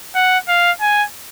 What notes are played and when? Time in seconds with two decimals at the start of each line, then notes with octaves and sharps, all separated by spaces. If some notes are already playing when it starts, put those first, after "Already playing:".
0.15 F#5
0.48 F5
0.81 G#5